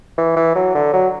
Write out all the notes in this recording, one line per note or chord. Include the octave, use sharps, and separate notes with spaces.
E3
E3
F#3
D3
F#3